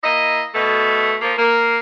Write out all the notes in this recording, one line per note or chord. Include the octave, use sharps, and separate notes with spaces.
A#3 E4 D#5
B2 A3
F3 A#3
A#3